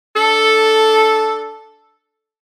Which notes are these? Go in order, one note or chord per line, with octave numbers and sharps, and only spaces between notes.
D4 A4